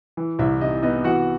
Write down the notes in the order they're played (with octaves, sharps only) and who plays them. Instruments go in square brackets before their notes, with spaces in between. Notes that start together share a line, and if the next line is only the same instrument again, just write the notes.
[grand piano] E3
C2 E4 E5
C3 D#4 D#5
B3 D#4 D#5
E3 F#4 F#5